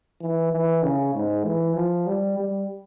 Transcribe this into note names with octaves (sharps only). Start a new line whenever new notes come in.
E3
E3
C#3
G#2
E3
F3
G3
G3